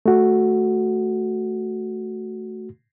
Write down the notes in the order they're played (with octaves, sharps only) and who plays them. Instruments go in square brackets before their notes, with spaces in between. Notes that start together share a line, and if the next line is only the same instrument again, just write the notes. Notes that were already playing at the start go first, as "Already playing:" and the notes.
[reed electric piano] A3 F#4